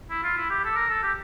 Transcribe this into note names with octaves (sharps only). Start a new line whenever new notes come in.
E4
F4
E4
G4
A4
A#4
A4
G4